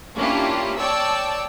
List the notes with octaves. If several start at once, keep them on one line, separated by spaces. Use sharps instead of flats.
A#3 C#4 D4 E4 F4 G4
C#5 D5 G5 A5 E6